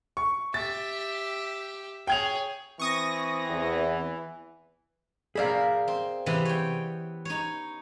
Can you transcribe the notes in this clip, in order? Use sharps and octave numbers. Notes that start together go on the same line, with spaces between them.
C#6
G4 E5 A6
G#4 C#5 G5 G#6 F7
E3 C4 C#6 D#6 A#6
E2
G#4 A#4 D5 E5 F5 B5
C4
C3 E3 B3
C#5 G5
D#4 C#5